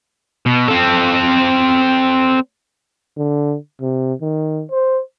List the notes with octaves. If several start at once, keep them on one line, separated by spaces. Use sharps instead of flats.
B2
C4 A4
D3
C3
D#3
C5